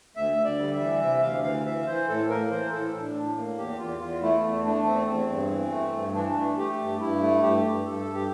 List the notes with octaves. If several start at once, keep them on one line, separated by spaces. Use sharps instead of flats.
D2 E5
D2
D5
G3
E5
E3
C3 E5
D2 F5
E3 F5
E3 E5
E3 C5
A2 A4
A#3 A#4
E3 C5
A2 A4
A2
D4
A2
A#3
E2 G4
E2 F4
E2 F4
A3 E4
E2
A3 D4
E2 C4
E2 C4
G2
E3
A3
G2
E3 D4
A3
A3 G4
G2
G2 E4
A3
G2 G4
G2
G2 A4
G2
G4